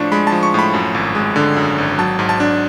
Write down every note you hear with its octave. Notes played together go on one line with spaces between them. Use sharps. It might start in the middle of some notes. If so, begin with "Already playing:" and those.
Already playing: A2 F3 D4 C#6
G#3 B5
A5
F3
C#6
A2 B5
F#2
G#1
G#3
D3
F#2
G#1
F#3 A5
G#2
A5
D4